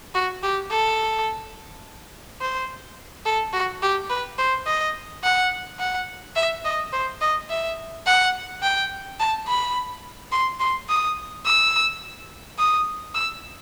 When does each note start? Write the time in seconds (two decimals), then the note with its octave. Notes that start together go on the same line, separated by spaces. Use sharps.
0.15 F#4
0.43 G4
0.71 A4
2.41 C5
3.25 A4
3.53 F#4
3.82 G4
4.10 B4
4.38 C5
4.66 D#5
5.24 F#5
5.80 F#5
6.36 E5
6.65 D#5
6.93 C5
7.21 D#5
7.50 E5
8.06 F#5
8.62 G5
9.20 A5
9.48 B5
10.32 C6
10.60 C6
10.89 D#6
11.46 E6
12.59 D#6
13.15 E6